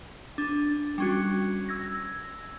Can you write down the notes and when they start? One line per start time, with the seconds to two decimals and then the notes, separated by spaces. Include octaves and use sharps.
0.38 D4
0.98 G3 C#4 F#4
1.69 E6 G#6 A#6